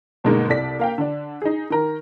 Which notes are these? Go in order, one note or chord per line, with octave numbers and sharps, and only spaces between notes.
G2 B2 D3 G#3 A#3 D#4
C2 A4 D5 B6
A#3 F5 G5
D3 D4
D#4 G#4
D#3 A#4